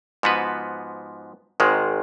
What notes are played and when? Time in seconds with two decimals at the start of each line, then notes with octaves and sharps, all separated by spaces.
0.23 G#2 F3 B3 F#4 B4
1.60 G#1 G#2 D#3 G#3